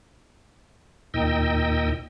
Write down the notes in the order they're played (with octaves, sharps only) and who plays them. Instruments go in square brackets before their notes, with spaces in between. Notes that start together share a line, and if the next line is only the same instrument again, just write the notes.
[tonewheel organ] D#2 A#2 D#4 D#5 G5 E6